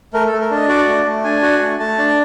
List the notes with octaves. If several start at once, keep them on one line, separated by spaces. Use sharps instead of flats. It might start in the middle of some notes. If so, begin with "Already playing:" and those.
A3 A#4
A4
A3
A#4
D4
D#5
F#4 D5
A3
A3
D4 G#5
F#4
A3
A3 A5
D4